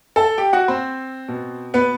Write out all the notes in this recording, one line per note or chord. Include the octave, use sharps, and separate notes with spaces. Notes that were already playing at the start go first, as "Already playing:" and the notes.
A4 A5
G4 G5
F#4 F#5
C4 C5
B2
B3 B4